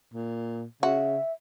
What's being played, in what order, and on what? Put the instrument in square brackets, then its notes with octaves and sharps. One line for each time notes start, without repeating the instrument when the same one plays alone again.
[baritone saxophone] A#2
[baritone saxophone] C#3 [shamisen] F#4 [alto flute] E5